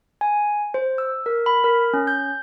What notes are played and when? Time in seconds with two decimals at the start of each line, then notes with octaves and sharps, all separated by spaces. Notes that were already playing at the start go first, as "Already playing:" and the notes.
0.21 G#5
0.74 C5
0.98 E6
1.26 A#4
1.46 B5
1.64 A#4
1.94 C#4
2.07 G6